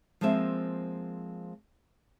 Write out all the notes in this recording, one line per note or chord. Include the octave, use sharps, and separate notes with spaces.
F3 G#3 A#3 C4 E5